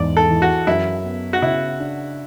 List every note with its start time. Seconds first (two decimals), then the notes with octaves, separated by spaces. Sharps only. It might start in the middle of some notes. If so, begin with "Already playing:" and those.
Already playing: E2 G#2 D5
0.17 A4
0.30 E3
0.42 F#4
0.67 F#2 E4
1.04 B3
1.33 F#4
1.42 C#3 E4
1.80 D4